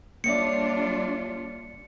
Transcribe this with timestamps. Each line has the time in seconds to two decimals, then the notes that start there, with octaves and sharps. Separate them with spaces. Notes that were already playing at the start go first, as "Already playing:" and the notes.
0.24 G3 A#3 D4 F4 C#5 E5 C#7